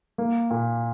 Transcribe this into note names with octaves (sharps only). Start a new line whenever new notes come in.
A#3
A#2